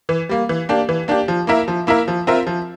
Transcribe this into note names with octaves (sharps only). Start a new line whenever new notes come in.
E3
G3 A#3
E3
A#3 D4 G4
E3
A#3 D4 G4
F3
A#3 E4 A#4 E5
F3
A#3 E4 A#4 E5
F3
C4 F4 A#4 E5
F3